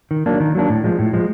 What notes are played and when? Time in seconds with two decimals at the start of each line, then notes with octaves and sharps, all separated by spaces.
0.11 D#3
0.26 F#3 A#3 D4
0.40 D#3
0.55 F#3 A#3 D4
0.70 A2
0.84 F3 G#3
0.99 A2
1.13 F3 G#3